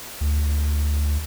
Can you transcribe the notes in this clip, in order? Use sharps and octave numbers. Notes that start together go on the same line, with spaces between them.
D2